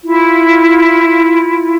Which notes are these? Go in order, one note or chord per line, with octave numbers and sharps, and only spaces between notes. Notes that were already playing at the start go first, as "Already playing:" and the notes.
E4 F4